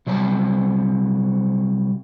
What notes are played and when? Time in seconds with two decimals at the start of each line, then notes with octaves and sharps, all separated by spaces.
0.07 C3 F#3 G3 A5